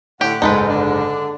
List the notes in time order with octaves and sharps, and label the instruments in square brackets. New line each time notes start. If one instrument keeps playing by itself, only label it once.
[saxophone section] A2 F#5 [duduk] D3 [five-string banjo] G4
[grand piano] F#1 G#2 [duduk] G#3 [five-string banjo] D#4 A4 B4
[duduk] D3 [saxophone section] D4